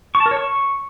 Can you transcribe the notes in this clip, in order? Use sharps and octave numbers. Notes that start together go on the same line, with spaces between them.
C#6
A5
A#4
C#5
C#6